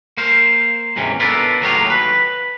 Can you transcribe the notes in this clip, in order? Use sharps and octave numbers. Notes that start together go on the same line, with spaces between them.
A#3 C5 F5
D#2 G#2 C3 E3 C#4
B3 D4 E4 F4 A4 A#4
D#2 A2 F#3 G#3 G4 F5
B4